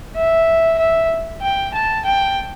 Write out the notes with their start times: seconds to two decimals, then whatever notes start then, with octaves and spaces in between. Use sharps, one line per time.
0.17 E5
0.79 E5
1.42 G5
1.74 A5
2.05 G5